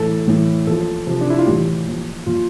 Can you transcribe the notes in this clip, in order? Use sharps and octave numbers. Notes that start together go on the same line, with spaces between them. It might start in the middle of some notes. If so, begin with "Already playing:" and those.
Already playing: A2 E3 A4
A2 E3
A#2 F3 A4
C3 F3
D4
E4
F4
A2 E3 G4
A#2 F3
A#2 F3 F4